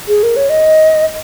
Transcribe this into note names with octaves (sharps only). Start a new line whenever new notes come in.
G#4
A#4
C#5
D#5